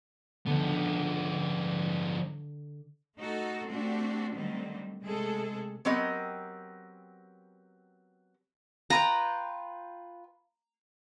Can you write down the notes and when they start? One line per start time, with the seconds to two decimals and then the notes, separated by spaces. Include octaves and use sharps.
0.47 D3 F3 B3
3.17 A3 D#4 F#4 A4
3.68 A3 C4 D4 F#4 G4
4.33 D3 D#3 F#3 G3 A3 C4
5.03 C3 G#3 A3 G#4 A4
5.85 F#3 B3 C4 G4 A#4 D#5
8.90 F4 B4 G5 A#5